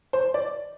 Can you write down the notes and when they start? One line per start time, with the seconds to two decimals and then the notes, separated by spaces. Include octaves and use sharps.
0.13 C5
0.34 D5